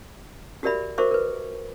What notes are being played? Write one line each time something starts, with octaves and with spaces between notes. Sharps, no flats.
F#4 G4 A#4 D5 E5 B5
F#4 A#4 C5 E5 C#6 D6
A#4 B4